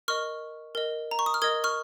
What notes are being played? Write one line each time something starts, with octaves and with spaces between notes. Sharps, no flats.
A#4 D#5 C#6 F6
A#4 D#5
A#5
C#6
D#6
F6
A#4 D#5 D#6 G#6
C#6 F6